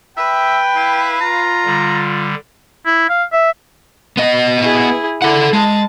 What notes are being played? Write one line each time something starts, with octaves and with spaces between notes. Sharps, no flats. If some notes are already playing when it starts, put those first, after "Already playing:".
B4 E5 G5
E4 F5
F4 A#5
D3 G3
E4
F5
E5
B3 D#5
E4 G#4
E4 A4 F#5
G#3 A5